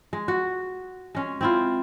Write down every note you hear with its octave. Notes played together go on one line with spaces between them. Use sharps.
G#3
F#4
G#3 C#4
C4 E4 F4